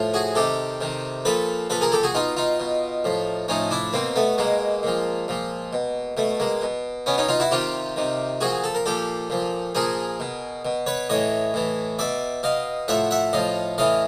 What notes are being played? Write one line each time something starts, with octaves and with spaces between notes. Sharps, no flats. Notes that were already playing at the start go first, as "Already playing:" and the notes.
Already playing: A2 F3
F#4 G#4
C3 D#3 G4 A4
C3 D#3
A#2 F3 A4 B4
A#2 F3 A4 B4
G#4 A#4
G4 A4
F#4 G#4
B2 D#4 F4
D#4 F4
B2
A2 F3
A2 F3 C#4 D#4
D4 E4
B2 A#3 C4
A3 B3
B2 G#3 A#3
A#2 F3
A#2 F3
B2
B2 A3
G#3 A#3
B2
B2 B3 C#4
C#4 D#4
D#4 F4
E4 F#4
C3 D#3 F4 G4
C3 D#3
A#2 F3 F#4 G#4
A4
A#4
A#2 F3 G4 A4
A#2 F3
A#2 F3 G#4 A#4
B2
B2
B4 C#5
A2 E3 C#5 D#5
A2 E3
B2 D5 E5
B2 D#5 F5
A2 F3 E5 F#5
E5 F#5
A2 F3 D#5 F5
A2 E3 D#5 F5